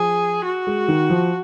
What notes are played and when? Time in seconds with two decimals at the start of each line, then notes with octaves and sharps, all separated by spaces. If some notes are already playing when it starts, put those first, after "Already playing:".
Already playing: F3 G#4
0.45 F#4
0.67 G#3
0.88 D#3
1.10 F3